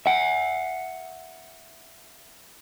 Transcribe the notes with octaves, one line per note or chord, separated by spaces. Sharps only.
E5 F#5